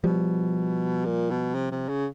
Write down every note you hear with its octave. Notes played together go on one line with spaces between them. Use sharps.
B2 F3 G3
A#2
B2
C3
C3
C#3